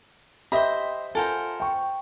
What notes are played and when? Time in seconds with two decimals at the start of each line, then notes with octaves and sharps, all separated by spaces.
0.52 G4 C5 D#5 E5 B5
1.15 F4 A4 A#4 C5 F#5 G#5
1.60 G5 C#6